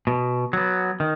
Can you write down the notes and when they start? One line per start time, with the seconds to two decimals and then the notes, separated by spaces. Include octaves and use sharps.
0.07 B2
0.53 F#3 B3
1.00 D#3